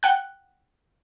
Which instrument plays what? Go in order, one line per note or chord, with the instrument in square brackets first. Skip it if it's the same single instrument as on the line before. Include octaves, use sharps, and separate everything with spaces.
[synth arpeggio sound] F#5 G5 F#6